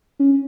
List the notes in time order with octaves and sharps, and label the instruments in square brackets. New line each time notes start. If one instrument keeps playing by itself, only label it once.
[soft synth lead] C#4